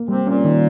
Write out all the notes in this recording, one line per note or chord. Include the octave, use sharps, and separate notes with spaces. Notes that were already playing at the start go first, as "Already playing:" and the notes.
Already playing: A#3
C3 G3
A#2 C#4
D#3